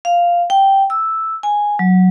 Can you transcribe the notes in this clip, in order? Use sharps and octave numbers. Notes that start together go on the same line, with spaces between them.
F5
G5
E6
G#5
F#3